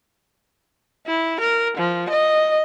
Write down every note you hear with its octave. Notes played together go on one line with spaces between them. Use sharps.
E4
A#4
F3
D#5